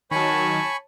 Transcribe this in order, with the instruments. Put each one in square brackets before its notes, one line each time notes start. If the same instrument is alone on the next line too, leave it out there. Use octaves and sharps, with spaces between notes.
[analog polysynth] D#3 F#3 [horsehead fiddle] C#5 A5 [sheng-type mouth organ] G#5 B5 C#6